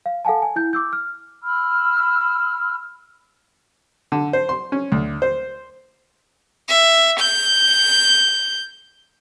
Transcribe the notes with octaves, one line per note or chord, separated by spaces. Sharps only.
F5
A4 F5 F#5 G#5 A5
G#5
E4 G6
D6 E6 G6
F6
B5 E6 F6
D3
C5
C6
C#4
D2
C5
E5
G6